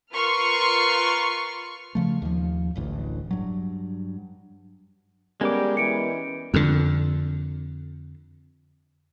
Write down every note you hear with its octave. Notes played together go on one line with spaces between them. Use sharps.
F4 A#4 B4 C6 C#6 F6
C#3 F3 A3
D#2 F3
D1 A1 D2
G2 F#3
G3 G#3 B3 C#4 G4 A#4 D6
E3 C#7 D7
F2 D3